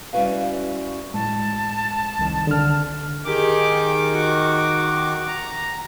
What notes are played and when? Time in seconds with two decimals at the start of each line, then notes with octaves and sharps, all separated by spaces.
0.13 G3 C#4 E4 F#4 B4 F5
1.14 A2 G#3 A5
2.19 C2 D#3
2.47 D3 F6
3.25 D#3 G4 G#4 D6
4.13 F#4
5.28 A#5